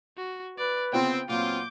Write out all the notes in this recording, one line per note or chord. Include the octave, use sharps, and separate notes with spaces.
F#4
B4 D5
C#3 B3 C4 F4 G5
A#2 F#3 B3 C4 F4 D6 G6